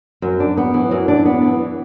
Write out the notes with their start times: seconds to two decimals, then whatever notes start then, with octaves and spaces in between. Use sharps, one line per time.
0.22 F#2
0.40 D4
0.57 B3
0.74 E3
0.91 F#2
1.08 D4
1.25 B3
1.42 E3